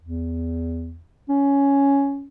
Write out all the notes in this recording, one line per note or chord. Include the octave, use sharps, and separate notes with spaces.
E2
C#4